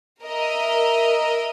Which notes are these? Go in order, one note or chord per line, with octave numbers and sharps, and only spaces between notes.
A#4 D#5 E5